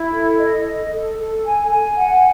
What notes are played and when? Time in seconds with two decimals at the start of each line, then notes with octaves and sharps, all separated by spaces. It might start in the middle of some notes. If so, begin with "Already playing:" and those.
Already playing: E4
0.12 A4
0.39 D#5
0.64 D#5
0.91 A4
1.18 A4
1.44 G#5
1.71 G#5
1.98 F#5